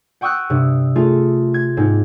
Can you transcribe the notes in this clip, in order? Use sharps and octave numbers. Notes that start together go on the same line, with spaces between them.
F#5 G5 C#6 D#6 E6 F#6
G2 C3
A3 F4 G#4
G#6
G#2 A#3 C4